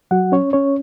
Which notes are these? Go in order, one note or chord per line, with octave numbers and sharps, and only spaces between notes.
F#3 F#4 F#5
C#4 C#5
C#4 C#5